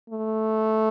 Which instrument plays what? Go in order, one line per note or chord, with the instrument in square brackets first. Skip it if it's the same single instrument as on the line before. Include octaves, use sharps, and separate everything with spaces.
[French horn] A3